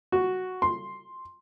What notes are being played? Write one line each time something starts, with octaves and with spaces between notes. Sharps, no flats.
F#4
C6